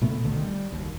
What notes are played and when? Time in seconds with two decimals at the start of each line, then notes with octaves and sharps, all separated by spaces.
0.01 A#2 C#3 A3 B3
0.24 B1 D3 D#3 A3
0.42 G3
0.71 F#1 D#2